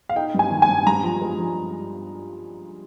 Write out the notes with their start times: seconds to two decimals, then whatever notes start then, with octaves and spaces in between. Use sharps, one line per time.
0.09 F5
0.16 D#4 G5
0.34 G2 G#5
0.51 D#3
0.62 G#5
0.69 G2
0.86 G2 A#5
1.04 F3
1.22 G#3
1.39 F3